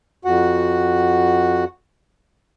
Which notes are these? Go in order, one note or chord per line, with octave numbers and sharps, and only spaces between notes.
F2 F#4 F#5